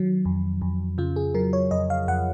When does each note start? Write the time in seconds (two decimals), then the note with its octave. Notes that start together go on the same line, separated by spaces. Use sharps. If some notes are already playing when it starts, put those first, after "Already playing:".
Already playing: D#3 F#3
0.25 F2
0.62 F2
0.98 C#3 F4
1.16 G#4
1.34 F#3 A#4
1.53 C#5
1.71 F2 D#5
1.90 F5
2.08 F2 F#5